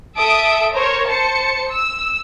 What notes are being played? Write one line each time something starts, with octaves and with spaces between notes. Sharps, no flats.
A4 E5 D#6 D7
A#4 C5 C#5
C5 A5 C#7
E6